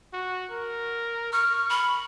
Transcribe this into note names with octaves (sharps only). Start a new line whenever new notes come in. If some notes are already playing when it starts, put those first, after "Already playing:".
F#4
A#4
C#6 F6
B5